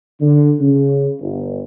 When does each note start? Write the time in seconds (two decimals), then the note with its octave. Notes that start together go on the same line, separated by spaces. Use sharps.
0.20 D3
0.60 C#3
1.20 G1